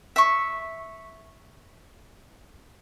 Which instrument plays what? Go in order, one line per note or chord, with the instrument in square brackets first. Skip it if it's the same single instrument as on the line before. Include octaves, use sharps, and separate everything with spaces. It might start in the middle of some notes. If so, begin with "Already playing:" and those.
[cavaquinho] E5 C#6